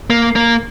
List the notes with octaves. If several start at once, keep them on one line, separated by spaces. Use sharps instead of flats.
A#3
A#3